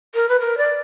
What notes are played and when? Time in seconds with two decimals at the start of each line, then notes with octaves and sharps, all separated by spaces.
0.15 A#4
0.29 B4
0.40 A#4
0.58 D5